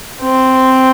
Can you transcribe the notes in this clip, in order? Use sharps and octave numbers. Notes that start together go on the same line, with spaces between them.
C4